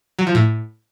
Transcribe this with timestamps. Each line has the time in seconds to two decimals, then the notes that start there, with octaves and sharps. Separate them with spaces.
0.19 F#3
0.27 F3
0.35 A2